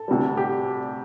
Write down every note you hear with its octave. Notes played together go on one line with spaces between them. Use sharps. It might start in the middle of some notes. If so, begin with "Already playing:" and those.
Already playing: A4
D2 C3 G3
G4